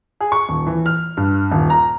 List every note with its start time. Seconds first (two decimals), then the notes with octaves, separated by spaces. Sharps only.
0.20 G#4
0.32 C#6
0.49 D#1
0.66 E3
0.86 F6
1.17 G2
1.52 D#1
1.70 A#5